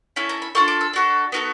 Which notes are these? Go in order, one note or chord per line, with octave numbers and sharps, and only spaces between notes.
C#4 E4 A4 B5
A#5
B5
D4 F4 A4 C#6
D6
E6
D4 F#4 A4
B3 D#4 F#4 A4